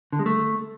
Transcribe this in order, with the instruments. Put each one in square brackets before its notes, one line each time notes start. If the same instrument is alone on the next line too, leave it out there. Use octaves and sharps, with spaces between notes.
[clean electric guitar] D3
G#3
A3